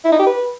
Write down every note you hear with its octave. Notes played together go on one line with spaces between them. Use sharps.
E4
D#4
G4
B4